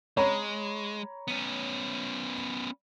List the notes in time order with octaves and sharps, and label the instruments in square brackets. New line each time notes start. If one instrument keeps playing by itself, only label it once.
[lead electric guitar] G#3 [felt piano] C#5 A#5 B5
[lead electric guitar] B3 C#4